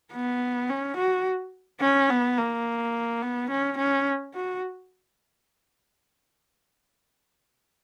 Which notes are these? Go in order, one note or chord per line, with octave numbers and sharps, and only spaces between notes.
B3
C#4
F#4
C#4
B3
A#3
B3
C#4
C#4
F#4